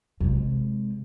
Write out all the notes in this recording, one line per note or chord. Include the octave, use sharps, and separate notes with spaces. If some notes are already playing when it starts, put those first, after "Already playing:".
C3 G#3